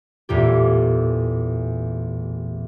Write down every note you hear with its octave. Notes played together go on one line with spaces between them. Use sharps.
A1 E2 A#2 G4